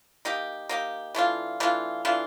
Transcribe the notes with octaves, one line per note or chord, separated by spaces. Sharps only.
A#3 D#4 G4
A#3 D#4 G4
E3 A3 D4 F4
E3 A3 D4 F4
E3 A3 D4 F4